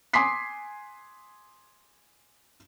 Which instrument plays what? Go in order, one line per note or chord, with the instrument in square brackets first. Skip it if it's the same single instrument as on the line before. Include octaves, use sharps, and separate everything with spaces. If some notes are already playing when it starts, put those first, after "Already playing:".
[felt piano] G#5 C6 D6 D#6 B6 C7